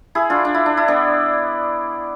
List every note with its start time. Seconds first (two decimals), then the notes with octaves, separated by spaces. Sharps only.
0.15 E4 G#4
0.30 D4 F4
0.45 D4
0.54 E4
0.66 D4
0.77 E4
0.88 B3 D4